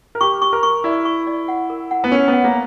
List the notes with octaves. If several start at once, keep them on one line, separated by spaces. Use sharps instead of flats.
A#4
G4 C#6
C#6
A#4
C#6
E4 D5
C#6
D5
F#5
A#4
F#5
B3
C#4 A#4
B3
F#5
A#3